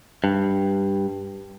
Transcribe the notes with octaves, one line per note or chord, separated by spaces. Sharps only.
G2